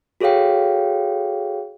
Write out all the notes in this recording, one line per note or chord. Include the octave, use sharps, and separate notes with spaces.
F#4 G#4 A4 C#5 F5 G5